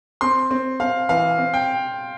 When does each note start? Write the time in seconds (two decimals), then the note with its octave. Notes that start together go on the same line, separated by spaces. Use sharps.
0.21 C4 C6
0.51 C4
0.80 C4 F5
1.09 E3 F5
1.38 C4
1.54 G5